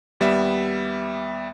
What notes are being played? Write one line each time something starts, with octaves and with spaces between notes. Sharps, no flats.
D#2 G3 B3 E5 E7